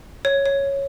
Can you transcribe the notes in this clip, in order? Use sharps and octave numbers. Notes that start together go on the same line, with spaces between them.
C#5
C#5